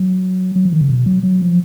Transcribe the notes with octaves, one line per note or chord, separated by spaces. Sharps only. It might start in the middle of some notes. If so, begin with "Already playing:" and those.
Already playing: F#3
F#3
F3
D#3
C#3
B2
F#3
F#3
F3